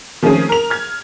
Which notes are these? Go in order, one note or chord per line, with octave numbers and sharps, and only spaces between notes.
D#3 F3 A3 C4 C#4 G#4
A#4 F7
F6 G#6